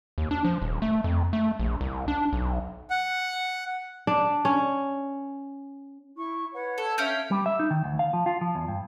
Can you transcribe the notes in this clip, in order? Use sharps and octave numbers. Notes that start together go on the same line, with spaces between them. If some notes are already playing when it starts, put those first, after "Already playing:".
D#2
D4
F3
D#1
A3
F2
A3
A#1
C2
D4
B1
F#5
D4
C#4
E4 C#6
B4 C#5 F#5
A4
C#4 C#5 E5 F5 G5
G3
E5
D#4
D#3
D2
F5
F3
F4
F3
E2
G2